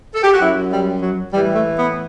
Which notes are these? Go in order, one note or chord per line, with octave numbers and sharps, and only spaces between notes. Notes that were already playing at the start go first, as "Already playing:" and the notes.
A4
G4
F#4
F#2 F#3 E4
G3
F#3
A2 E3 G3
A3
B3